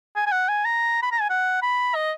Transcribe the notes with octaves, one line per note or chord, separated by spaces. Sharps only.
G#5
G#5
F#5
G#5
A#5
B5
A#5
G#5
F#5
B5
D#5